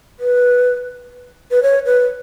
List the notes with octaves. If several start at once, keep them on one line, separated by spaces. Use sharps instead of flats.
B4
B4
C#5
B4